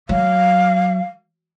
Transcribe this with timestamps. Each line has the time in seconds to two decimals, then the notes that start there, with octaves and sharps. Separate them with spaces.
0.09 F#3 F5